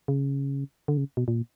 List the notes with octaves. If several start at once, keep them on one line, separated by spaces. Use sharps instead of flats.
C#3
D3
C#3
B2
A#2